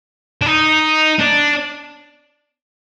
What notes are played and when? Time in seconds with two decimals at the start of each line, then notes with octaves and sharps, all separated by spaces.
0.41 D4
0.46 D#4
1.19 D4